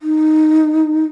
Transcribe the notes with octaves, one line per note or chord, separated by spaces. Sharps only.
D#4